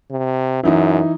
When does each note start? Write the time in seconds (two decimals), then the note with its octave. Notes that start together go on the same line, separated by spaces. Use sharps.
0.11 C3
0.63 F#2 E3 D#4 E4